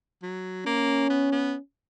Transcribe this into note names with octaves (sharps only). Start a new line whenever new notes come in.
F#3
A#3 C#4
B3
B3